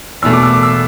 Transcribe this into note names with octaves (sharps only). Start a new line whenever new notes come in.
E2 B2 A3 E6
D6
E6
D6
E6